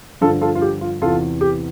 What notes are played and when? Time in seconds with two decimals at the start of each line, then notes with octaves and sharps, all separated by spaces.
0.21 G2 D3 F3 F4 A4
0.41 F4 A4
0.55 F4
0.61 G4
0.81 F4
1.01 E2 C3 E3 F4 A4
1.41 G4